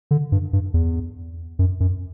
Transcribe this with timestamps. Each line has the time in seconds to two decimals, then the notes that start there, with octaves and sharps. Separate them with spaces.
0.11 D3
0.32 G2
0.53 G2
0.74 E2
1.59 F#2
1.80 F#2